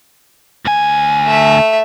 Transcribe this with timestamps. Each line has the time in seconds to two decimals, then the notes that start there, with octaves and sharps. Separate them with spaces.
0.65 D2 G#5
1.25 A3 E5